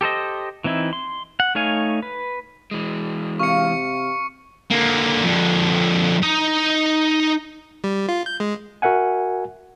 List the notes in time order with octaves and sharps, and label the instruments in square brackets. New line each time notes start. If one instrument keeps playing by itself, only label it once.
[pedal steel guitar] G4 A4 C5 D#5
E3 C4 D#4 E4
C6
F#5
A3 D#4 C#5 F5 G#5
B4
[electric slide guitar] E3 G#3
[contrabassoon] C3 [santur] F5 [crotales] C#6 C#7
[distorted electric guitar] D3 A#3
F2 D3
D#4 D#5
[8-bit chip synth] G3
F4
G6
G#3
[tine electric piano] F#4 A#4 E5 F#5 G#5